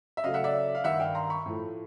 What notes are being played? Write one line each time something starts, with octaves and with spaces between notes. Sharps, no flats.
E5
C#3 F#3 A3 D#5 F5
E5 F#5
D5 E5
F5
G2 D#3 G3 E5 F#5
F5 G5
A#5 C6
B5 C#6
A2 F3 A3